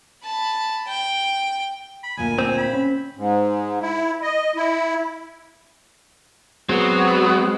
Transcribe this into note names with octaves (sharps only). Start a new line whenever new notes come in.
A5 B5
G5
B5
D2 A#2 G#5
C4
B5
C#4
G#2
E4
D#5
E4
F#3 G#3 B3 C4 F#4